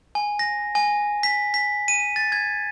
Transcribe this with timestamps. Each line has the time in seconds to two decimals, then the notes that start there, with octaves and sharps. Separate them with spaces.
0.15 G#5
0.39 A#6
0.75 G#5
1.23 B6
1.54 B6
1.88 D#7
2.16 A6
2.32 G#6